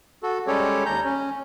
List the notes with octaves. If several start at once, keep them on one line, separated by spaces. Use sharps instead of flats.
F#4 A4
G3 G#3 C#4 G4 A4 C#5
D#2 A#5 G6
C#4